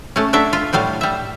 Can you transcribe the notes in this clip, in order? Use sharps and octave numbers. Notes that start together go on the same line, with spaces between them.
A3 C#4
F#3 D4 A4 E5
F4
A2 F#3 G3 F5
G3 E5